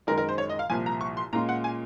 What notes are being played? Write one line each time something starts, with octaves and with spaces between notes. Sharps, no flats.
F#2 D#3 G#3 A#4
A#4
C5
C#5
D#5
F5
C2 A#2 F3 G#5
A#5
C#6
C6
A#2 G#3 C#4 F4 A#5
F#5
G#5